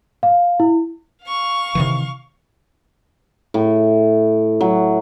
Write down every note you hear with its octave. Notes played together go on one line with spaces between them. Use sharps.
F5
E4
F5 C#6
C3 D#3 E3
A2
F#3